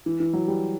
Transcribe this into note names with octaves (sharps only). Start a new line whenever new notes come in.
E3
E3
F#3
G3